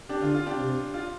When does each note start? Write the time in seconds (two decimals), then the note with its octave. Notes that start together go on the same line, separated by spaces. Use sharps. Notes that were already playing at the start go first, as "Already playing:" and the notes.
0.09 D4 G4
0.22 D3 F4
0.34 F4
0.46 D4 G4
0.58 C3
0.94 F4